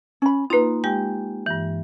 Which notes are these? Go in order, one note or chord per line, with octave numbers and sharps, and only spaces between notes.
C#4 B5
A#3 D#4 F4 B4
G#3 G4 G5
G2 E3